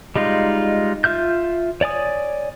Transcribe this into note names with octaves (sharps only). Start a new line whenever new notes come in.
G3 G#3 D#4 F4
F4 E5 F6 G6
C#5 D5 G#5 D#6